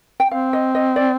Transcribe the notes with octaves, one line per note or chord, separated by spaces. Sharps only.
G5
C4 F5
D#5
D#5
D5